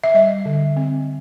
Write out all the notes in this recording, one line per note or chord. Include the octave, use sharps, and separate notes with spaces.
E5
G3 D#5
D3
C4